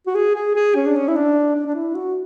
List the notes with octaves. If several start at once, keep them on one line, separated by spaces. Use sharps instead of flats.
F#4
G#4
G#4
G#4
C#4
D4
C#4
E4
D4
D4
D4
E4
F#4